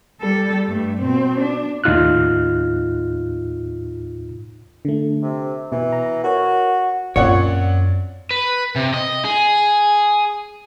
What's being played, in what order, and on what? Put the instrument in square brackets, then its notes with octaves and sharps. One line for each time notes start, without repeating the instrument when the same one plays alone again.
[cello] G3 A4
G2 A3
B2 C4
D4
[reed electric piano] D#2 A2 D#4 F4 F6 F#6
[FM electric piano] D3 A3
[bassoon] C3
[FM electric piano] B2 [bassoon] E3
[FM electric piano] A#5
[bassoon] F#4 [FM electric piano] A#4 C#5
[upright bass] F#2 C4 [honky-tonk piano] A#2 D5 F#5 [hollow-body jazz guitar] C#5
[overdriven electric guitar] B4
C3
D#5
G#4